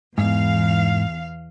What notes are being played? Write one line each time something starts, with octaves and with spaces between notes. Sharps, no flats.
E2 G#2 F5